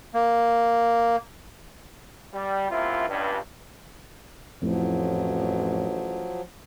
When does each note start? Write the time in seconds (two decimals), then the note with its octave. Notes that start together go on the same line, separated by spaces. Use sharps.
0.14 A#3
2.34 G3
2.70 F#2 C3 A#3 E4 F4
3.09 C#2 G2
4.62 A1 F2 A2 F3 F#3